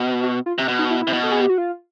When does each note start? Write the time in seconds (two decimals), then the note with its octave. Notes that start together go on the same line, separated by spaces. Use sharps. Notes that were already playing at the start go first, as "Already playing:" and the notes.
Already playing: B2
0.23 F#4
0.46 F4
0.58 C3
0.68 B2
0.79 D#4
0.91 E4
1.01 E4
1.07 C3
1.13 B2
1.23 A4
1.32 G#4
1.41 G4
1.49 F#4
1.58 F4